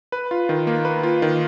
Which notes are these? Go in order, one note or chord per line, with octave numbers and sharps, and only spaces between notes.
B4
F4
D#3
A#3
B4
F4
D#3